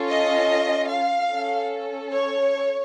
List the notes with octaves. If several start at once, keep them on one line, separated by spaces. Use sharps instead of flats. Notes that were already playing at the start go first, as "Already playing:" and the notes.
Already playing: C#4 F4 A4
D#5
F5
C#4 A4
C#5